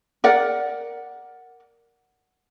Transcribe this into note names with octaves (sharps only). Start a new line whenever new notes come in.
A#4 D5 F#5